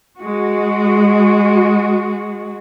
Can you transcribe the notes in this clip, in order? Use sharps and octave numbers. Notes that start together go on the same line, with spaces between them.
G#3 F#4